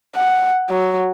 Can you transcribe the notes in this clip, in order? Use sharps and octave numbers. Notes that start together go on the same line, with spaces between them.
F#5
F#3